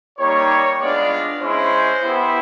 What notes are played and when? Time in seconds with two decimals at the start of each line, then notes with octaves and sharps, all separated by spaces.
0.18 G3 A#3 D#4 G4 C#5
0.80 G#3 B3 D4 F4 D5
1.42 G#3 C#4 E4 C5
2.04 B3 E4 G4